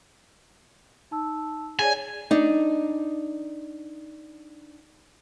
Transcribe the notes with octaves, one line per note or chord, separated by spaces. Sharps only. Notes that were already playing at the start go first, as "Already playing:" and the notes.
D#4 A5 E6
G#4 C#5 D5 G#5
D4 D#4